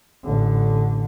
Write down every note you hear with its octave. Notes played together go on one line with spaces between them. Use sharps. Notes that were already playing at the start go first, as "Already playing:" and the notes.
A1 D3